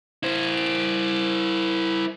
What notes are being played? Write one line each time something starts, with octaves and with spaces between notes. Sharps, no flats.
E4 C5